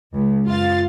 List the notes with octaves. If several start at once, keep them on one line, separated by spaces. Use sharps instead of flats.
C#2
F#2 F4 F5 A6